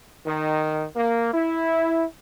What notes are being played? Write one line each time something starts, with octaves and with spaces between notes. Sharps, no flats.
D#3
A#3
E4